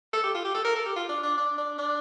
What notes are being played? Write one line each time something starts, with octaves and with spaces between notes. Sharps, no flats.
A4
G4
F4
G4
A4
A#4
A4
G4
F4
D4
D4
D4
D4
D4